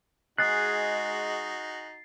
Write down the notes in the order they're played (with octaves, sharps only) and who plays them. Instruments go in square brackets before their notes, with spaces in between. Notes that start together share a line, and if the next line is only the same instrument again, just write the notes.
[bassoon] G#3 [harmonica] D#4 F#4 [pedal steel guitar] G#4 F#6 [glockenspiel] A6 C7